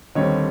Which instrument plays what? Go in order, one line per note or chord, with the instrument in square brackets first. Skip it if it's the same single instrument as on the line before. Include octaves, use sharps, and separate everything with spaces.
[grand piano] D#2 D3 G3 C4 C#5 D#5